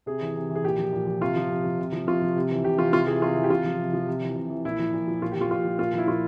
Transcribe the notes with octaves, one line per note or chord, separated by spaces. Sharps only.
C3 G#4
E3
C3
E3
G#4
A#2 G4
F3
A#2
F3
C3 F4
F3
C3
F3
C3
F3
C3 F4
F3
C3
E3
C3 G4
E3 F4
C3 F4
E3 G#4
C3 F4
E3
G4
C3 F4
F3
C3
F3
C3
E3
C3
E3
A#2 E4
F3
A#2
F3
A#2 F4
G4
F3 F4
A#2 F4
F3
A#2 F4
F3 E4
A#2 F4